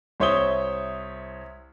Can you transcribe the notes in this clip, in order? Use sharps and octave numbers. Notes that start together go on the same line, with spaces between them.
C2 C5 C#5 E5 D#6 G7